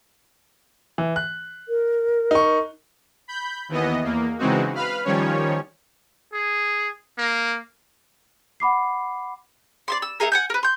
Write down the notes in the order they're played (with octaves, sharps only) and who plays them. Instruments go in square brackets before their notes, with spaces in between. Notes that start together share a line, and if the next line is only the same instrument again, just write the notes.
[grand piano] E3
F#6
[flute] A#4
[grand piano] D#4 C#6
[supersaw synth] B5 G6
D#2 E3 B3 D#5
E2 A#3
C#3 E3 G#3 C4 D#4 F#4
B4 F5 B5 F6
D#3 F3 G3 C#4 C#5
[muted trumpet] G#4
A#3
[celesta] F#5 B5 D6 C7
[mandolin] D5 E5 C6
E6
A3 D#4 G#4 A#4
F#5 G#5 G6
A#4 B4
C6 G6